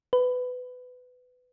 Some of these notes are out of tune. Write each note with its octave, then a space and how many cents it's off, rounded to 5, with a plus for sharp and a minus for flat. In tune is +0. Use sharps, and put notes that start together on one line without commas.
B4 +20